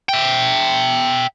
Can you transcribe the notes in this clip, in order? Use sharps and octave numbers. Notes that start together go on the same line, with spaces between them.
E5 G5